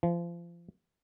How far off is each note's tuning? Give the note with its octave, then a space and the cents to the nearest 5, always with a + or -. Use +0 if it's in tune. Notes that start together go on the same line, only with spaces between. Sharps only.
F3 -30